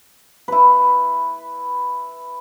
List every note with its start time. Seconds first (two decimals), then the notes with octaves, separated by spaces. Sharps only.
0.48 E4 B4